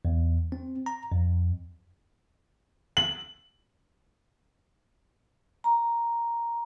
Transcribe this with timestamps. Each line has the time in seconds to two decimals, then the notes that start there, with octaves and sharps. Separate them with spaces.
0.05 E2
0.52 C4
0.86 A#5
1.12 F2
2.97 F#7
5.64 A#5